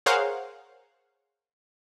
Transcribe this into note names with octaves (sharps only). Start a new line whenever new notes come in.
G#4 A#4 C5 C#5 F5 F#5